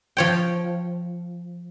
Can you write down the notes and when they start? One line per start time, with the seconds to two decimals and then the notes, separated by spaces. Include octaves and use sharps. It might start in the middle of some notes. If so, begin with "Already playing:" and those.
0.17 F3 C#5 G5